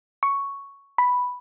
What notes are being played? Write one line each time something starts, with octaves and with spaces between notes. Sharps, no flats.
C#6
B5